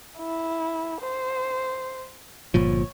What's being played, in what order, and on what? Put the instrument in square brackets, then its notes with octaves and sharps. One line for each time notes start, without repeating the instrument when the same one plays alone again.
[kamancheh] E4
C5
[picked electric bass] G1 A#2 F3 [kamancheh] C#5